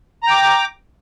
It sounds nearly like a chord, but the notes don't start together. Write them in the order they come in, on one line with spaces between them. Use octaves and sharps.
A#5 G5 D6